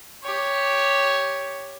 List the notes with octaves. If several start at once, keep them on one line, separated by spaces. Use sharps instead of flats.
G4 C#5